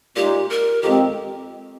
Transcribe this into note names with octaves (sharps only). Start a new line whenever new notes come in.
A#2 G#3 D#4 G4
A#4
F2 D#3 G#3 C4 G4